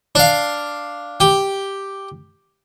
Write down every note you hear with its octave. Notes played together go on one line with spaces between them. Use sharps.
D4 F5
G4